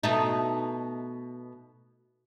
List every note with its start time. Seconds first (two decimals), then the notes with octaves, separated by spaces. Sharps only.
0.03 B2 A3 D#4